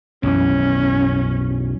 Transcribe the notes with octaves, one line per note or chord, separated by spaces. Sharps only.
B1 F#2 E3 C#4